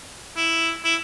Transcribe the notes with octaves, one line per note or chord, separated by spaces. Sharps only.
E4
E4